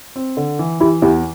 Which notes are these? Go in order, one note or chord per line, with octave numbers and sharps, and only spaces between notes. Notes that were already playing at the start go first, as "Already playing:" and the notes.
C4
D3
E3
E3 E4 G4
E2 E4 G4